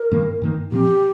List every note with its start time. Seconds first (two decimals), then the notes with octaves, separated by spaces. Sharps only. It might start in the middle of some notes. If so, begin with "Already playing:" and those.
Already playing: A#4
0.11 G2 D#3 A#3
0.42 G2 D#3 A#3
0.72 A#2 F3 C4 G4